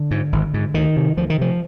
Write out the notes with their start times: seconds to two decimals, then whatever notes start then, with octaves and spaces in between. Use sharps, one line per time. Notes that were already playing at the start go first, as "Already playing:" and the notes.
Already playing: D3
0.11 G#2
0.32 G#1
0.54 G#2
0.74 D2 D#3
0.96 C3
1.17 D2 F3
1.30 D#3
1.38 C3 F3